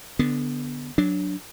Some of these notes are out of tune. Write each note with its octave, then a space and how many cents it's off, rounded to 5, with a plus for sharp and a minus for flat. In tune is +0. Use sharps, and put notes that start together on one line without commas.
D3 +0 B3 +0
F#3 +0 D4 +0